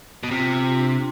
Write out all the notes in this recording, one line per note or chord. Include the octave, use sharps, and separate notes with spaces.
B2
C3 F4
F4
D4